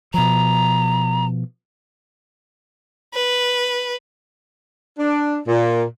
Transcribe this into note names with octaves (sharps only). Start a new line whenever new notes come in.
B2 F3 A#5
B4
D4
A#2